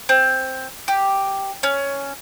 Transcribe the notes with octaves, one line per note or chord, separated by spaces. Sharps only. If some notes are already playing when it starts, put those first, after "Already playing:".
C4
G4
C#4